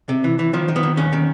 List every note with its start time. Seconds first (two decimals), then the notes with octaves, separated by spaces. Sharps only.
0.09 C3
0.24 E3
0.39 E3
0.53 D#3 F3
0.68 D#3
0.76 B3
0.83 D#3
0.97 D#2 C#4
1.13 D#3